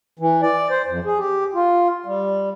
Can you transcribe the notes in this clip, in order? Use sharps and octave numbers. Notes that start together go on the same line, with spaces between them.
E3
D5
C5
F2
G#4
G4
F4
G3